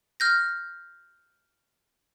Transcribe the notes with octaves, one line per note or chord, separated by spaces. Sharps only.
F6 G6 A#6